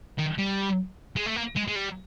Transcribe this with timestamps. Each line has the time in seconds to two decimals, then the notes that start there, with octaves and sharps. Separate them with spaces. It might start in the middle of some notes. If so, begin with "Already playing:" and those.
0.18 D#3
0.38 G3
1.16 G#3
1.26 A3
1.36 A#3
1.56 G#3
1.68 G#3
1.75 G3